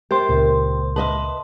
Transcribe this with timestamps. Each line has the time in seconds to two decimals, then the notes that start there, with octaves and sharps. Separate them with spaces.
0.11 G4 A#4 C5 C6
0.29 C#2 A#2
0.96 B4 D#5 E5 A5 C6